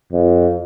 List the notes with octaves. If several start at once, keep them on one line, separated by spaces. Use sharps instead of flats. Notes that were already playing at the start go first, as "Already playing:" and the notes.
F2